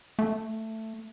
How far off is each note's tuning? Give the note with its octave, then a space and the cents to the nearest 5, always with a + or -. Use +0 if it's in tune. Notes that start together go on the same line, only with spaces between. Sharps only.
A3 +10